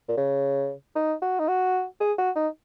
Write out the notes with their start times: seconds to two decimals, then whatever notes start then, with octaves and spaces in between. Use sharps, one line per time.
0.08 A#2
0.17 C#3
0.95 D#4
1.22 F#4
1.39 D#4
1.48 F#4
2.00 G#4
2.18 F#4
2.35 D#4